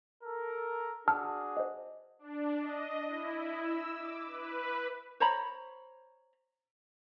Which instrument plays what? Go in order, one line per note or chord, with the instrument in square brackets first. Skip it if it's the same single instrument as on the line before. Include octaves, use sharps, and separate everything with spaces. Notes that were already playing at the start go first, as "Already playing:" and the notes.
[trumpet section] A4 A#4
[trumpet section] D4 F#4 G#4 [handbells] A5 E6 F6
[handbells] C5 D#5
[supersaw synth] D4
D#5
E4
E6
D6
B4
[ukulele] C5 C#5 A#5 B5